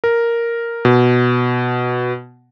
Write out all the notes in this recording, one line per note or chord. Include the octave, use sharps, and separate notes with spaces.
A#4
B2